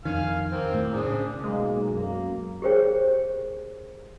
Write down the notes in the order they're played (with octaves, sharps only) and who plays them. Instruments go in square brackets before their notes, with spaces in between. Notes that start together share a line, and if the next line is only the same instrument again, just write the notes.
[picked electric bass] F2 D#3 [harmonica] F5 G#5 F6
[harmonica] A#3 C4
[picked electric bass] A2
[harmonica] C4 D4 G#4
[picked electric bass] C#3
[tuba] B1 [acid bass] G#3 [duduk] A#3
[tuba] F#2 [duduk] A#3
[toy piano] G4 G#4 A#4 C5 C#5 G5